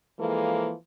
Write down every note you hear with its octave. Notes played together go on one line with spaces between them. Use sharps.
E3 F3 G#3 A#3 A4